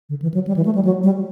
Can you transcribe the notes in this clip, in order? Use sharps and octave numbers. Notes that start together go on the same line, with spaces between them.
D3
E3
F#3
G3
E3
A3
G3
F#3
G3